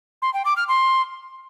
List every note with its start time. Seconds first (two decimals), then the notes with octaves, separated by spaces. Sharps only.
0.22 C6
0.34 G5
0.45 D6
0.57 F6
0.68 C6